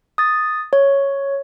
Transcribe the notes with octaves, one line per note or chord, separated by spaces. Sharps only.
D#6 A6
C#5